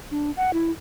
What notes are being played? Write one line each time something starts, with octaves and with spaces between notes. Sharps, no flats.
D4
F#5
E4